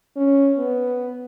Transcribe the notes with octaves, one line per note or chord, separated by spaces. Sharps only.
C#4
B3